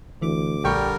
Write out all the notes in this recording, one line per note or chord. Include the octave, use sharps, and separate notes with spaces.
D2 E3 D6
A#1 D3 G3 G4 A#4 G5 C#6